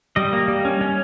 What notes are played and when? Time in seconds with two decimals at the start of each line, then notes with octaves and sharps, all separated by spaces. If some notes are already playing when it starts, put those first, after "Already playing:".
0.16 G3 D#5
0.33 A#3
0.48 G3
0.65 C#4
0.81 C#4